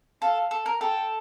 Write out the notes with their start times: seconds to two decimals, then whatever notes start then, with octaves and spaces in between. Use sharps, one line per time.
0.22 A4 F5
0.51 A4
0.66 A#4
0.81 A4 G5